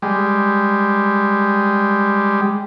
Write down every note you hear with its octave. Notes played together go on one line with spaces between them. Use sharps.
G3 G#3